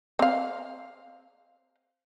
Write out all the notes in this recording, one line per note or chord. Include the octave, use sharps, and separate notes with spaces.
C4 F5